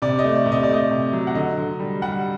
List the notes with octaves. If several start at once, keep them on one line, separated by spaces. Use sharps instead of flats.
C3 D5
D#5
A3
D5
C3
D#5
D5
A3 D#5
C3
F#3
F#5
D3 D#5
D3
G3
G3 F#5